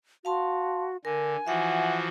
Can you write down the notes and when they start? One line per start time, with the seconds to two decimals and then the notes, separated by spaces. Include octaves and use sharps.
0.25 F#4 F5 A5 C6
1.05 D3 A#4 G#5
1.47 E3 F3 F#4 E5 F#5